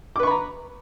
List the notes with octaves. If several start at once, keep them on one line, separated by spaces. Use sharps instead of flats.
B4 A#5 B5 C#6 D6